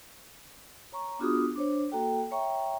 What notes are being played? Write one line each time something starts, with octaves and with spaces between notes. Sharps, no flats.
C#5 A#5 C#6
B3 D4 F4 F#4 G#4 D#6
D4 C5 C#5
A#3 F#4 A4 G5
C#5 E5 G5 A#5 C#6